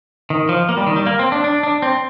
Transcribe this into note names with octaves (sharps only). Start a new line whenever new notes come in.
D#3
F3
A#3
G3
D#3
G3
A#3
C4
D4
D4
D4
C4